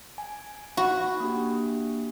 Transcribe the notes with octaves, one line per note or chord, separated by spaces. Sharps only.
G#5
F#4 B5
A#3 D4 G4